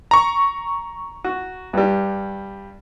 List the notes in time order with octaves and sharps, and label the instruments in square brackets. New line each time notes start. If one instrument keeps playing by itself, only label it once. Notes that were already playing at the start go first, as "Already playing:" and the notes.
[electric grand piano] A#5 C#6
[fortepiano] F#4
G2 G3